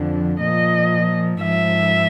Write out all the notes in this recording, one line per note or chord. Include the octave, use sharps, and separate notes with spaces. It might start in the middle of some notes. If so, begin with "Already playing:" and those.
Already playing: F2 D3 F3
A#2 F3 D#5
G#2 F3 E5